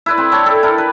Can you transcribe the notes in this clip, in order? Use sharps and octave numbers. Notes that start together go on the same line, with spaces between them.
E4 B4 D5
C4
D4 C#5 D5 G5
A4
D4 E4 A#4
B4